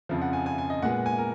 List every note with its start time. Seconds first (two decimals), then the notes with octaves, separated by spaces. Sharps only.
0.09 F2 C#3 F3
0.22 F#5
0.33 G#5
0.46 G#5
0.58 G#5
0.70 D#5
0.82 A#2 G#3 B3 F#5
1.06 G#5
1.18 A#4